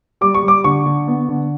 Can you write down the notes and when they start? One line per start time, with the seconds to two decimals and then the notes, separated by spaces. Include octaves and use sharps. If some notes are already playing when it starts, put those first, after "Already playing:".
0.21 G3 D6
0.34 C#6
0.43 G3
0.48 D6
0.64 D3 C#6
0.86 D3
1.07 B3
1.29 D3